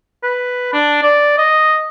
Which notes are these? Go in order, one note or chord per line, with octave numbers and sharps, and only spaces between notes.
B4
D4
D5
D#5